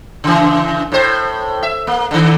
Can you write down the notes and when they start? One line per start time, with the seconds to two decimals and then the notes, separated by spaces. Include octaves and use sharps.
0.24 C#3 E3
0.92 A2 C5
1.63 E5
1.87 A#3
2.11 D3 D#3